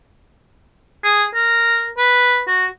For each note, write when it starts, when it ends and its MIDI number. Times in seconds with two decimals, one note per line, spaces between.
1.04 1.25 68
1.34 1.89 70
1.98 2.41 71
2.47 2.66 66